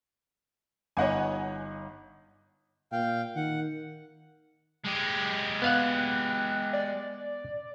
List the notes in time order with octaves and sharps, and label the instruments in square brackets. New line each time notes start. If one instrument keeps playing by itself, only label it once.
[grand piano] G1 D#4 D#5 [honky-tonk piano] C#5 F#5 G#5
[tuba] A#2 [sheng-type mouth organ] F5 G5
[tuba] D#3 [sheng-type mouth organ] F#5
[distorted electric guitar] G#3 G4
[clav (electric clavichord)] B3 F5 F#5 [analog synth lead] F#6
[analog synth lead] D5